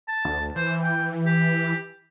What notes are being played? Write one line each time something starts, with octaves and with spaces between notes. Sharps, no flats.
A5
D2
E3 C5
G5
G4